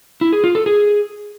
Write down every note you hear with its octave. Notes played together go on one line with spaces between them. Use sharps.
E4
G#4
F4
A4
G#4